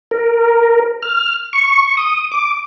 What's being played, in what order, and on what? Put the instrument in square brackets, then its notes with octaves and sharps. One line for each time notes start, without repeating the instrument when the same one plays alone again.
[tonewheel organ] A#4
F6
C#6
D#6
D6